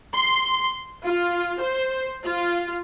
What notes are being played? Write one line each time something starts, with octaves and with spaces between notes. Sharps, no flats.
C6
F4
C5
F4